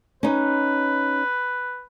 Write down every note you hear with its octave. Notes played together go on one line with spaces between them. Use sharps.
C#4 D#4 B4